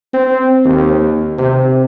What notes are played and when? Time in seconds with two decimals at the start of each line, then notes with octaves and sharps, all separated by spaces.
0.13 C4
0.64 D#2
1.38 C3